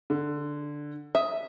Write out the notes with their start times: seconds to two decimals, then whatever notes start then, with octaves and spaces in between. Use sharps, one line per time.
0.10 D3
1.15 E5 D#6